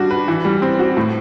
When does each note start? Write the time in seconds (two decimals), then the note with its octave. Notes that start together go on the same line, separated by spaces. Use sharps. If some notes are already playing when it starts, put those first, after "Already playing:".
Already playing: G3 D4 F#4
0.11 B4
0.28 E3
0.45 G3
0.62 C4
0.79 F#4
0.97 A2